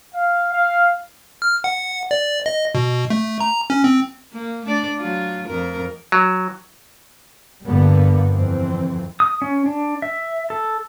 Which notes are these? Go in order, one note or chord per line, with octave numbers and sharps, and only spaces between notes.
F5
F5
F6
F#5
D5
D#5
B2
A3
A#5
C#4
C4
A#3
A3 D4 D5
F#3 F4
F2 A#4
F#3
G1 G2 D3 G3 A#3 B3
F2 E3 C4
D#6
C#4
D4
E5
A4